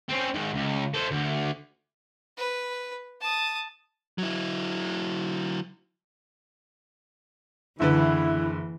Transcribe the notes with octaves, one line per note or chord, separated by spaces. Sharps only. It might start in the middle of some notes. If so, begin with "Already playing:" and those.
C4 C#4
G#2 D#3
C#2
A4 C5
D2
B4
A5 D#6
F#3 E4
F#1 D3 E3 E4 B4